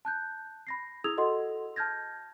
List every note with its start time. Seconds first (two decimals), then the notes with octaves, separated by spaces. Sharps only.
0.05 A5 F#6 G6
0.67 B5 A#6 C7
1.04 E4 G#4 D#6 E6 G#6 F7
1.17 F#4 A4 D#5 F#5 C6
1.76 A5 F6 G6 G#6 A#6